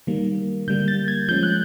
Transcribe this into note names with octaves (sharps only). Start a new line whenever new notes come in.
D#3 G3 A#3
D3 G3 A#3 G6
A6
G#6
F3 G#3 C#4 G6
F#6